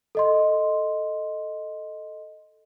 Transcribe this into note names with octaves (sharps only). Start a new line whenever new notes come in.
A4 D#5 C6